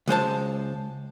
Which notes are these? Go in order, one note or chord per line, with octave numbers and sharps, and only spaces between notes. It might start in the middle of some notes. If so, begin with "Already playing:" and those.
C#2 G#3 C5 A5